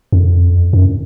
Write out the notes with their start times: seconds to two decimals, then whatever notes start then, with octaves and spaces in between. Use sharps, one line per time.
0.12 F2
0.73 F#2